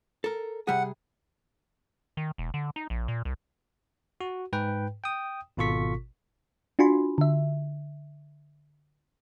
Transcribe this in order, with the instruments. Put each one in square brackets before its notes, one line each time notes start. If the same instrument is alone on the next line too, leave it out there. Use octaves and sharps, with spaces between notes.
[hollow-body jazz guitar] A4 A#4
[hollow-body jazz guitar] C3 G3 G#4 [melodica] F#5
[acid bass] D#3
E1
D3
D#4
A#1
A#2
C2
[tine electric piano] F#4
G#2 B4 G5
G5 D#6
G#1 B2 F4 A4 C#6 B6
[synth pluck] D4 F4 F#4 G#5 B5 C6
D3 E5